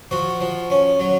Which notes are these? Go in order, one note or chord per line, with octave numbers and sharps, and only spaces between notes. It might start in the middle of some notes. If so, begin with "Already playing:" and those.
F3 F#4
F3
C#4
F#3